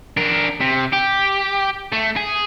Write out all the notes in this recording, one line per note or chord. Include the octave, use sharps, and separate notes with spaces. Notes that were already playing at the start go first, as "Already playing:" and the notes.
D4 A#4
C3
G4
A3
G#4